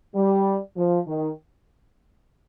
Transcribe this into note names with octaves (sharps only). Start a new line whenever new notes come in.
G3
F3
D#3